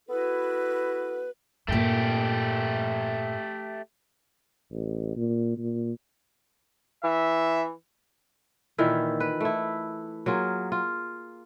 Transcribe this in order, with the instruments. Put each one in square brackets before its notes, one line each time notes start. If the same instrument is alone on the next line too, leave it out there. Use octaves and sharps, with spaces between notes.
[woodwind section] B3 E4 F#4 A4 B4
[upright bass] G2 A#2 [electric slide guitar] A3 G4
[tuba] A1
A#2
A#2
[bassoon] E3 [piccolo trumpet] E5
[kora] A#2 D#3 E3 E4
B4
A3 E4
F#3 A#3 F4 G#4
F4